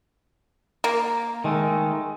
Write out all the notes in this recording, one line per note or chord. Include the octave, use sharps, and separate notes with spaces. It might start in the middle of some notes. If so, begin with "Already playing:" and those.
A#3
D#3 G#3 A3